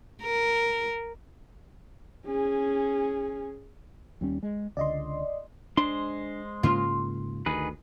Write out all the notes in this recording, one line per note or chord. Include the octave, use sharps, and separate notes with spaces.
A#4
C#4 G#4
D#2 G3 C#4
G#3
C#2 D3 D5 D#5 C6
G#3 D4 C5 C6
G#2 C#3 A#3 F4
D2 D#3 G#4 B4